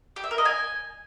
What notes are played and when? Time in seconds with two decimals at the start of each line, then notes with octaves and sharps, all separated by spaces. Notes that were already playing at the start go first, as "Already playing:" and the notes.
0.16 G4
0.24 E5
0.31 A#4
0.38 D#5
0.45 G#5